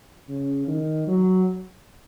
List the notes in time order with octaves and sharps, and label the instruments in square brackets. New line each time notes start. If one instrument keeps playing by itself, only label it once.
[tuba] C#3
D#3
F#3